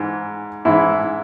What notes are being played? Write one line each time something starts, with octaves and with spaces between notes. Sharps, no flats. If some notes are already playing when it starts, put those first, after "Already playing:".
Already playing: G#2 E3
G#2 E3 E4